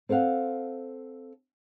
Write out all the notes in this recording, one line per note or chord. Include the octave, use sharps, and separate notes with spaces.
C4 A4 C5 F5 F#5